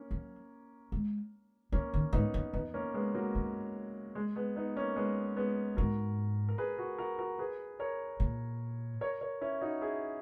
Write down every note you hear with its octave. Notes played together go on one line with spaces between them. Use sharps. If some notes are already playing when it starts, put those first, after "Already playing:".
Already playing: A#3 C#4
F#3
G#3
F#3 A#3 C#4
D#3
G#2 B3 D#4
F#2
E2 B3 D#4
A#3 C#4
G#3 B3
F#3 A#3
F#2
G#3
G#3 B3
B3 D#4
A#3 C#4
G#3 B3
G#3 B3
G#2 F#4 A#4
A#4
G#4 B4
F#4 A#4
F#4 A#4
F#4 A#4
G#4 B4
A#4 C#5
A#2
A#4 C#5
A#4 C#5
C#4 E4
D#4 F#4
E4 G#4